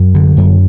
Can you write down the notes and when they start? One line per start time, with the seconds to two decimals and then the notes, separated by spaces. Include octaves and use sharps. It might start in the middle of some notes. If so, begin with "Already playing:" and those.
Already playing: F#2
0.15 D3
0.37 F#2